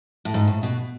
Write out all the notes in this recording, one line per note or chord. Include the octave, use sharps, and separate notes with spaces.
A2
G#2
A2
B2